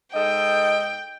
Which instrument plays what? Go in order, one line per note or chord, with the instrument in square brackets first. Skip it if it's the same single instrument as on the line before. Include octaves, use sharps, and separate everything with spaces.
[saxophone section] G#2 A4 D#5 [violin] G5